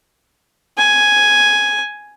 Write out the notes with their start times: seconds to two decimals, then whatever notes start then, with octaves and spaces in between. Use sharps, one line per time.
0.78 G#5